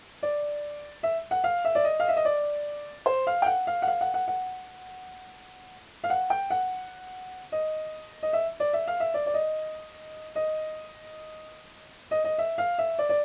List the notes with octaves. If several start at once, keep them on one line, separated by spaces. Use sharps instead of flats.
D5
E5
F#5
F5
E5
D5
D#5
F5
E5
D#5
D5
C5
F5
G5
F#5
F5
F#5
F5
F#5
F#5
F#5
F5
F#5
G5
F#5
D#5
D#5
E5
D5
E5
F5
E5
D5
D5
D#5
D#5
D#5
D#5
E5
F5
E5
D5
D5